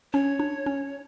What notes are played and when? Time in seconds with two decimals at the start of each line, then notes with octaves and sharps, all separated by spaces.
0.13 C#4 C#5
0.39 D4
0.66 C#4